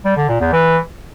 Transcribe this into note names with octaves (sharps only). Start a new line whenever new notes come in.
G3
D3
A#2
E2
E3